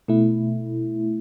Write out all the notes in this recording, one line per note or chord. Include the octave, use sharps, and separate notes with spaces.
B2 A3 E4